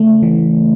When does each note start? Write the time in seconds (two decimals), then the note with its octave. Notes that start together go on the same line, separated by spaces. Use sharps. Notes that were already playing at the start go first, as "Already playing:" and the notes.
Already playing: C#3 A3
0.23 E3